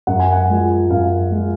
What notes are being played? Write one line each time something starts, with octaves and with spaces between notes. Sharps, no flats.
F#2 F#5
G#5
F#5
F3 G#3
F#2 F5
F3 G#3